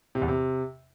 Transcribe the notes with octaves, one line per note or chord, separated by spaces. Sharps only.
C3
E2
C3